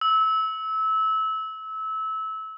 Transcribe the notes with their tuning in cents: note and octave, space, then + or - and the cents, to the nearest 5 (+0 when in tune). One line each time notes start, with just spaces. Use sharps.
E6 -25